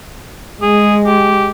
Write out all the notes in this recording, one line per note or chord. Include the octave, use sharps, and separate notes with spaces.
G#3 G#4
G4